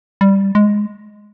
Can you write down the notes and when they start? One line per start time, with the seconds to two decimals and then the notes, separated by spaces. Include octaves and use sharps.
0.21 G3
0.55 G#3